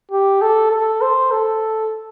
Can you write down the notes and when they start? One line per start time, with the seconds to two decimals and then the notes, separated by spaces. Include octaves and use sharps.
0.12 G4
0.42 A4
0.71 A4
1.02 C5
1.31 A4